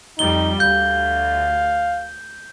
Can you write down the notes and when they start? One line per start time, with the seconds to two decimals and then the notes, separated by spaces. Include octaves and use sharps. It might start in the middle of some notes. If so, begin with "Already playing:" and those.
0.19 F2 G3 D#4 G7
0.60 D2 F5 G6